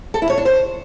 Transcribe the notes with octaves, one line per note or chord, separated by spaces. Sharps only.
A4
E4
C#5
D4
C5